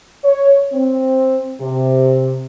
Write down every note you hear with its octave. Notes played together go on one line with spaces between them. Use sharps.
C#5
C4
C3